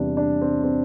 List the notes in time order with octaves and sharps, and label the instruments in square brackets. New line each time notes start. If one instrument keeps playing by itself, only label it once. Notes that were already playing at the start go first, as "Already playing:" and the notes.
Already playing: [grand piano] E2 C3 G3 D4
D4
C4
C4